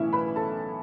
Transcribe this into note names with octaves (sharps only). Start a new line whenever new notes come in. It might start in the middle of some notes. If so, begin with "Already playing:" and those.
Already playing: B1 A2 E3 C#4 E4 E5
B4 B5
A4 A5